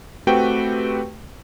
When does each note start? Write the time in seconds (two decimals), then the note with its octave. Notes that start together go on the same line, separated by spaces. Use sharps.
0.27 A3 C4 F#4 G4 B4 G5